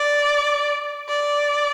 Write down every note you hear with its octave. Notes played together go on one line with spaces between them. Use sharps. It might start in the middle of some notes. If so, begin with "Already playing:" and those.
Already playing: D5
D5